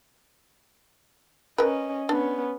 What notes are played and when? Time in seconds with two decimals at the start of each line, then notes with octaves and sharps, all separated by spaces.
1.58 C#4 A#4 B4 D#5
2.09 B3 C#4 D4